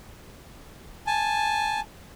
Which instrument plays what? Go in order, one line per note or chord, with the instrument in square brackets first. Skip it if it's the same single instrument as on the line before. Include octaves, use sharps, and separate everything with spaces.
[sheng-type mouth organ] G#5 A5